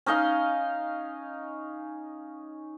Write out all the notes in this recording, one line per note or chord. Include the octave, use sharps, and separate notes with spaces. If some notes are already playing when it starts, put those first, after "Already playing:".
C#4 D#4 D#5 F5